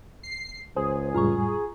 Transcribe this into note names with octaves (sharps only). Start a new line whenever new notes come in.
C7
C#2 G#4 C5
F2 A2 G3 F4 A#5 C#6